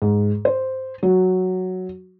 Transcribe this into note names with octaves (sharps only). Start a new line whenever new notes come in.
G#2
C5
F#3